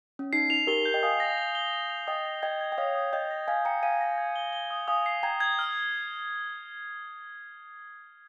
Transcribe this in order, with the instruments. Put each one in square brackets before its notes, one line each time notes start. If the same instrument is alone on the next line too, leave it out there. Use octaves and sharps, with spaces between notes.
[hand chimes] C#4
[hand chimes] D#4 [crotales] C7
[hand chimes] D#4 [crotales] F7
[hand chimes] G4 A#4 [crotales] G7
[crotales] G6
[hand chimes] D#5 G5
[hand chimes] F5 G#5 [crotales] D#6
[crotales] A#6
G7
G7
F7
F7
[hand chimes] D#5 G5 [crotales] D#6
[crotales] A#6
[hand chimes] D#5 G5 [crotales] G#6
[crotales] G#6
[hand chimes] G5
[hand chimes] C#5 F5 [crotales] D#6
[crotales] D#6
[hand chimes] D#5 G5 [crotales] G6
[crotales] A#6
[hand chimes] F5 G#5 [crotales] G#6
[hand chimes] G5 A#5 [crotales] C#7
[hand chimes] F5 G#5 [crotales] D#7
[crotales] A#6
G#6
G7
G7
D#6
[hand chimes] F5 G#5 [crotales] D#6
[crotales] C7
[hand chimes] G5 A#5 [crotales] G#6
[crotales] G#6
F6